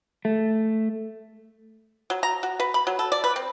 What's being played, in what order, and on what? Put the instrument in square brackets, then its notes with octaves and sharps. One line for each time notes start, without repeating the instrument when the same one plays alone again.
[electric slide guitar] A3
[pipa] F#3
A#5
F#4
B4
B5
F#3
A4
D5
B4
C4